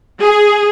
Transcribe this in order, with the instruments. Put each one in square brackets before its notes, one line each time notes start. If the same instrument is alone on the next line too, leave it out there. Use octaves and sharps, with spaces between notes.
[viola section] G#4